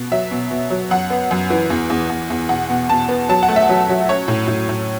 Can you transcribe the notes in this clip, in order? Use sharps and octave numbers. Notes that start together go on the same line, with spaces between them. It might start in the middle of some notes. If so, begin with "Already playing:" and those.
Already playing: B2
F#3 E5
B2
B2
F#3
F#2 F#5
B3
F#2
E3
E2
E2
E2
E2
B2 F#5
B2
B2 A5
B3
F#3 A5
F#5
A3
E5
F#3
F#3
C#4 C#5
A2
A2
A2